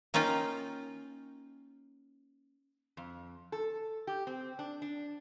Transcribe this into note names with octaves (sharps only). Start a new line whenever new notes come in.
A#3 C#4 D#4 F4 G5
F2
A4
G4
C4
D4
D4